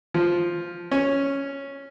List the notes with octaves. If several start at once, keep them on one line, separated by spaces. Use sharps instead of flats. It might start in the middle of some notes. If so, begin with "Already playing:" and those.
F3
C#4